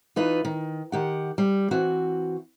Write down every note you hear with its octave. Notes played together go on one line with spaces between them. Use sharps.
E3 D#4 F4 B4
D#3
D#3 G4 F#5
G3
E3 C4 F#4